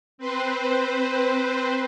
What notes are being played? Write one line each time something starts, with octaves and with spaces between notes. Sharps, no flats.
C4 B4 C5